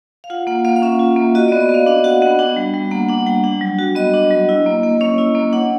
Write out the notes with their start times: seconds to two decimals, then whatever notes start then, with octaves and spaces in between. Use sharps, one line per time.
0.24 F5
0.30 F4 F#5
0.47 A#3 F#5
0.65 A#3 F5
0.76 F5
0.82 C#4 E5
0.99 F4
1.17 A#3
1.35 F#4 D#5
1.48 B3 D5
1.61 D#5
1.69 B3
1.74 F5
1.86 D4 F5
2.04 F#4 F#5
2.22 B3 F#5
2.39 D4 G5
2.57 G3
2.74 G3
2.91 A#3 F#5
3.09 D4 F#5
3.26 G3 G5
3.44 D4
3.61 F#3
3.79 F#4
3.95 B3 D#5
4.14 D4
4.31 F#3
4.49 E4
4.66 A#3
4.83 A#3
5.01 C#4 C#5
5.18 E4
5.35 A#3
5.53 D4 F#5